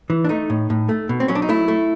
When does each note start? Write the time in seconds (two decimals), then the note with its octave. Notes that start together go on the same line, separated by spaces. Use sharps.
0.10 E3
0.24 D4
0.29 A3 D#4
0.50 A2
0.70 A2
0.89 A3
1.09 B2
1.20 C4
1.28 F#3 C#4
1.35 D4
1.42 D#4
1.49 A3 E4
1.68 A3